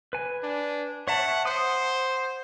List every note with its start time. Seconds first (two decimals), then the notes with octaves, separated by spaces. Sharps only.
0.13 B4 G#5
0.43 D4
1.08 C#5 E5 F#5 A5
1.45 C5 F#5 D#6